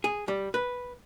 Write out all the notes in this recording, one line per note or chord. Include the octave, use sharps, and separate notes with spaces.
G#4
G3
B4